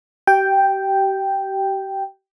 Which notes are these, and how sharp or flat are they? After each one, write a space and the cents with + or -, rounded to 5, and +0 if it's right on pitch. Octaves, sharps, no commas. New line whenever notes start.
G4 -35 G5 +0